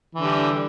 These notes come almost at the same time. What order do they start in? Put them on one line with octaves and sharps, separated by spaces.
E3 D3 G3